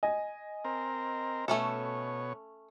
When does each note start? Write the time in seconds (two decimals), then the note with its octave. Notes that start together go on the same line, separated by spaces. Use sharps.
0.03 D#5 G#5
0.64 C4 A#4
1.48 B2 A3 C#4 A4 C#5